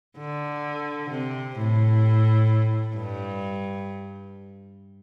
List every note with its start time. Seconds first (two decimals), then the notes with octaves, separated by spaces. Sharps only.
0.18 D3
1.10 C3
1.56 A2
2.95 G2